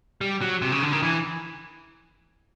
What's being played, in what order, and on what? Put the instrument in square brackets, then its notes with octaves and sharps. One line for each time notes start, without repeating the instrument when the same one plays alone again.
[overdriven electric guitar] G3
F#3
C3
C#3
D3
D#3
E3